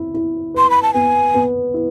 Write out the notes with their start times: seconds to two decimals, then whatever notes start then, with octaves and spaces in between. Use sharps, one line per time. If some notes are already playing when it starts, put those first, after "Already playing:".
Already playing: E4
0.14 E4
0.54 B4 C6
0.70 B5
0.83 A5
0.94 B3 G#5
1.34 B3
1.74 E4